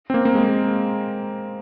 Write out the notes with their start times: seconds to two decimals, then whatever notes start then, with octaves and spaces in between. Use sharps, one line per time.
0.10 C4
0.14 A#3
0.25 A#3
0.35 G#3